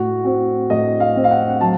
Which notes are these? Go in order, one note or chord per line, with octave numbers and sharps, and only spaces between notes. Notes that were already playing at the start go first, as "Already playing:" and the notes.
Already playing: A2 F#4
C4 F#4
A2 D#5
F5
C4
F5
F#5
F#5
F#3 A5